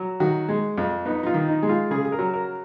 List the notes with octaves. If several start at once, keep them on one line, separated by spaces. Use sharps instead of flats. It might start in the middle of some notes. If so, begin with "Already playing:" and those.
Already playing: F#3
D#3 F#4
G#3
F2
B3 D#4
D#4
F4
D#3
D#4
G#3
F4
C#3 G#4
G#4
A#4
F#3
A#4